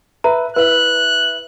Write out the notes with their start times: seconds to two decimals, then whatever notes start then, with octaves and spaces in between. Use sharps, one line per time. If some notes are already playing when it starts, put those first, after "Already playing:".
0.24 B4 E5 A#5
0.56 E4 B4 E5 F#6